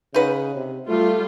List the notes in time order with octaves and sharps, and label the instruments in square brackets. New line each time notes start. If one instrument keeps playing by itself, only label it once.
[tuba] C#3 [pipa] D#4 B4 F#5
[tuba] C3
[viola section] G3 F4 [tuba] A3